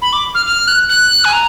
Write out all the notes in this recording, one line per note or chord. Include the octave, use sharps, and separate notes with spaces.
B5
D6
F6
F6
F#6
F#6
G#5
A#5